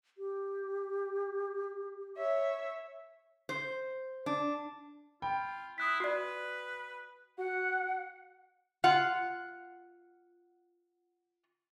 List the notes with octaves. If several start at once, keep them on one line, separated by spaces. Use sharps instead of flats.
G4
C#5 E5
C5
D4
F4 G5 B5
E4 D#6 F#6 B6
F#4 B4 D5
F#4 F#5
F4 F#5